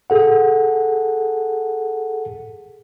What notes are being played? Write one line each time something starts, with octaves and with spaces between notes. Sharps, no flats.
G#4 A4 F#5